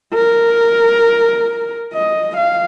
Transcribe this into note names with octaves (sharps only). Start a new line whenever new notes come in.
A#4
D#5
F5